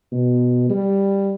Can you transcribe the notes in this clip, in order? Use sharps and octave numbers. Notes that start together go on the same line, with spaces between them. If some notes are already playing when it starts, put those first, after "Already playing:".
B2
G3